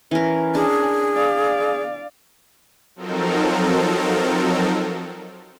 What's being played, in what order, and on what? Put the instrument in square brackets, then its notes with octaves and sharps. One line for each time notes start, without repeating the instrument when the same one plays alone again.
[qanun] E3 A#4 [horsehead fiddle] C#4
[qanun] D4 [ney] G#4
[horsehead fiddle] D5 F5
[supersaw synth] F3 F#3 C4 D#4 A4 A#4